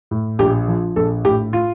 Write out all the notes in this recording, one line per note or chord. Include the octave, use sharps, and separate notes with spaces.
A2
A#1 G4
F3
A#1 A4
A2 G4
F4